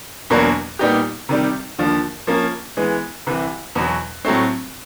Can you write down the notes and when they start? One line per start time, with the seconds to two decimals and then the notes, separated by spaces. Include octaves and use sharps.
0.30 E2 B2 F#3 A#3 D4
0.79 A#2 G3 B3 D#4 G4
1.29 C3 D#3 G3
1.78 D#2 D3 F3
2.27 F3 A#3 C#4
2.77 E3 G#3 B3
3.27 C2 C3 E3
3.75 E2 B2 F#3
4.25 A2 F#3 A3 C4